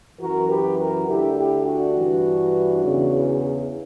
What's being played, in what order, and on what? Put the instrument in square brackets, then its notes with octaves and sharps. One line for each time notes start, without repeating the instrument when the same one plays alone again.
[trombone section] F#2 E3 F#4 A#4
G4 B4
F#4 A#4
D2 D3 E4 G4
E4 G4
D4 F#4
G2 E3
E2 C#3 E3